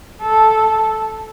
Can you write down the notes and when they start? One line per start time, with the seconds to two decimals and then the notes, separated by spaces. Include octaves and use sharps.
0.22 A4